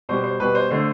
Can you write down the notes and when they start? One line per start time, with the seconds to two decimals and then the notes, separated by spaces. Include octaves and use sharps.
0.09 B2 G3 C5
0.24 C5
0.40 B2 G3 B4
0.55 C5
0.70 D3 A3 C5